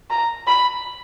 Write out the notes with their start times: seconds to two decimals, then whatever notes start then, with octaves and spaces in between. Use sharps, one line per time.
0.10 A#5
0.47 B5